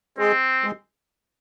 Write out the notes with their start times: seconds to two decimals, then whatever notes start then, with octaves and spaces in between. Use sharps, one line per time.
0.18 G#3 C4
0.64 G#3